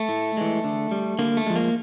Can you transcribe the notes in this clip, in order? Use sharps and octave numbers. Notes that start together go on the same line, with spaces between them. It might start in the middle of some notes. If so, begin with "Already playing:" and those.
Already playing: A3
A2
E3 G#3
D3
G3
D3 A#3
A3
F3 G#3
A#3